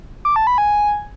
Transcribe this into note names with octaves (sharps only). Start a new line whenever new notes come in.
D6
A5
B5
G#5